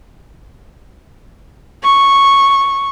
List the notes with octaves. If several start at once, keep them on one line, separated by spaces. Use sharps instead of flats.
C#6